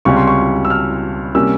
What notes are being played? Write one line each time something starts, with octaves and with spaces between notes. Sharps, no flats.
C#2 C3 G3 C#4 C#6
C6
C#6
E6
F6
C3 G3 A#3 C#4 E6